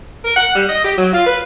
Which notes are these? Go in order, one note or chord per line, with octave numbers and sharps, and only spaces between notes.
A#4
F#5
G3
D#5
G4
F#3
F4
B4